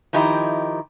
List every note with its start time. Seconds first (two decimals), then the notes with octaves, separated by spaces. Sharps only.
0.13 D#3 F3 D#4 E4 G4